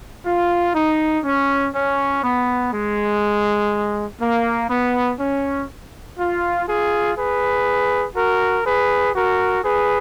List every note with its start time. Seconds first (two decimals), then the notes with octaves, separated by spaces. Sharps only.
0.26 F4
0.74 D#4
1.24 C#4
1.74 C#4
2.24 B3
2.73 G#3
4.21 A#3
4.70 B3
5.19 C#4
6.18 F4
6.68 F4 G#4
7.17 G#4 B4
8.16 F#4 A#4
8.65 G#4 B4
9.15 F#4 A#4
9.64 G#4 B4